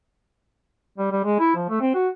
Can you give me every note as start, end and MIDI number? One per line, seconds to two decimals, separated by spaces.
0.98 1.10 55
1.12 1.23 55
1.24 1.39 56
1.39 1.55 64
1.56 1.68 53
1.69 1.80 57
1.81 1.91 60
1.94 2.08 66